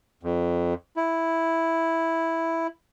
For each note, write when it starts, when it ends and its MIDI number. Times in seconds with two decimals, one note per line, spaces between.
0.23 0.74 41
0.96 2.67 64